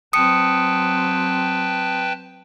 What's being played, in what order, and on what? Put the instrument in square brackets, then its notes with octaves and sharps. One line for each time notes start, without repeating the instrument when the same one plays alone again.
[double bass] F#3 C4 [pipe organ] B4 G5 A5 [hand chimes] D#6 C#7